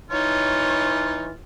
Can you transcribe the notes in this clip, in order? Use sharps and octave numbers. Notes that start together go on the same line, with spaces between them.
E3 D#4 F4 C#5